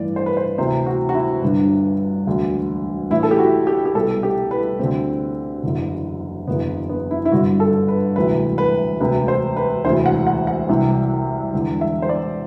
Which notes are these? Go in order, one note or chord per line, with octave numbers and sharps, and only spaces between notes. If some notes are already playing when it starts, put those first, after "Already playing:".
Already playing: A1 G2 E3 D5
C5
B4
C5
D2 C3 E3 C5
F#4
F#4
E4
G1 G2 D3 D4
E1 D2 D3
A1 A2 E3 E4
A4
G4
F#4
G4
G4
C2 B2 A4
G4
B4
D2 D3 C4
F#1 E2 D3
F#1 E2 D3 B3
B3
E4
E4
G1 G2 D3 F#4
A4
B4
E1 D2 C3 E3 B4
B4
E1 D2 C3 B4
C5
B4
E1 D2 C3 E3 C5
F#5
F#5
F#5
C2 C3 E3
E1 E2 D3
E5
C5
D5